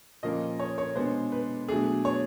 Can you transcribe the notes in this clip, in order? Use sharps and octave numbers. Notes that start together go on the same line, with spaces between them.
A#2 F3 A#3 C#4 D#5
C#5
C#5
B2 G#3 B3 D4 C5
B4
B2 F#3 A3 D4 G#4
C#5